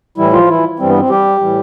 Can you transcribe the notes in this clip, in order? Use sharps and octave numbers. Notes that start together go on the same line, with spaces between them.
A2 E3 G3 E4
F3 F4
E3 E4
G2 E3 G3 C4
B3
C4
G3 G4
A2 E3 G3